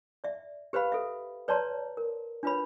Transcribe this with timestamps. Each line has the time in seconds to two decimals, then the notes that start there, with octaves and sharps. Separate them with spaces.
0.24 D5 E5
0.73 G4 B4 C5 F5 B5
0.92 A4 E5
1.48 B4 C#5 D5 A5 A#5 C6
1.97 A#4
2.43 D4 F4 B4 C#5 B5